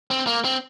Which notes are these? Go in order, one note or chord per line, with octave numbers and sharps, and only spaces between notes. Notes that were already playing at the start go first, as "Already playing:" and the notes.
C4
A#3
C4